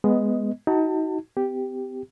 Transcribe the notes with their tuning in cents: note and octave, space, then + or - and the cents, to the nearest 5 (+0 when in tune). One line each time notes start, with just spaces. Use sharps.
G#3 +0 B3 +0 D#5 +10
D#4 +30 F#4 +20 A5 +30
C4 -45 G4 +0